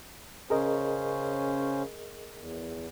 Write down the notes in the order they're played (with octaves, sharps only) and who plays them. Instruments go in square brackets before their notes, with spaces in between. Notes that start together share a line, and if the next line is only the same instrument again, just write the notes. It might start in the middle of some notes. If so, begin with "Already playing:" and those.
[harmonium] C#3 C#4 C5 [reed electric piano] G#4 A#4 D#5
[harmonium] E2